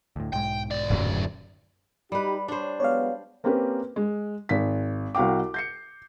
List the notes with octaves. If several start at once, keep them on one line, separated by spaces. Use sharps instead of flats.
D2 A2
B1 G#2 G#3 G5
D#2 D5
D1 F#2 F#3
G3 D#4 G4 B4
D4 C5 C#5
F#3 G#3 B3 C#5 D5 F5
A#3 C4 C#4 G4 A#4 B4
G#3
G#1 B6
C2 F#4 F5 G5 D6
G6 C7 C#7